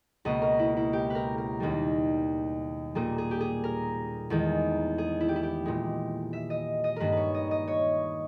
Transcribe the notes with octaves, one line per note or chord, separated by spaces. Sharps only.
C#2 B2 A#3 D#5
A#4
E4
E4
G4
A#4 B4
A#4
D#2 D#3 G3
A#2 G3 A#3 G#4
G#4
G4
G#4
A#4
E2 D#3 G#3
G#4
E4
G4
E4
G4
A#2 G#3
E5
D#5
D#5
G2 D#3 A#3 A#4 B4
B4 C#5
D#5
D#5
C#5